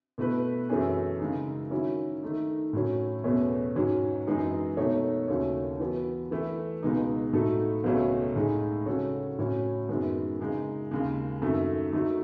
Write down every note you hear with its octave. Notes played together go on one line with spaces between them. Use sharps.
B2 A3 E4 B4
F#2 E3 A3 C#4 G#4
C#3 G#3 D#4
D#3 F#3 C#4 E4
D#3 A3 D#4
A2 F#3 C#4
E2 B2 A3 C#4
G#2 F#3 C#4
F#2 E3 G#3 D#4 G#4
B2 A3 D#4 A4 C#5
D#2 C#3 F#3 A3 C#4
E3 B3 F#4
E3 A3 E4
C#2 B2 G#3 D#4
A2 F#3 A3 D#4 A4
C#2 B2 F#3 A3 C#4
A2 G#3 D#4 G#4
C#3 F#3 C#4 F#4 A4
A2 F#3 C#4 F#4
F#2 D#3 G#3 B3
C#3 G#3 D#4
D#2 C#3 G#3
F#2 D#3 A3
F#3 A3 D#4